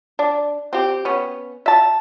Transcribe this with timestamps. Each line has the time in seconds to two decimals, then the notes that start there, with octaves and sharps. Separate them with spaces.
0.19 D4
0.73 C4 G4
1.05 B3 C#4
1.66 E5 A5